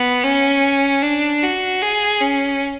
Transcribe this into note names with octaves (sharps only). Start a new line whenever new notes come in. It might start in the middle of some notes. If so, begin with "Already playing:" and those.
Already playing: B3
C#4
D4
F#4
G#4
C#4